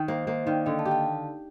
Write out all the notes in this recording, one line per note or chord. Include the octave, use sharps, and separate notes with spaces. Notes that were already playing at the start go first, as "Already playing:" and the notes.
Already playing: D#3
A#3 C5 D#5
A#3 C5 D#5
D#3 D5 F5
D3 D#5 G5
F5 A5
G4
F5 A5